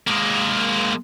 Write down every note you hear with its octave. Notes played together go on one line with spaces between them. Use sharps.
G#3 A#3